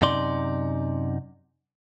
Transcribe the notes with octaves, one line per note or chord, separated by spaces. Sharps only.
F#2 C3 D#4 D5 C6